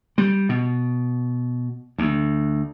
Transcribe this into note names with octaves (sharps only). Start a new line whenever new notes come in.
G3
B2
D2